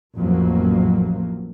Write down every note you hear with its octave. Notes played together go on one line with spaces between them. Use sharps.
A1 F2 F#3 A#3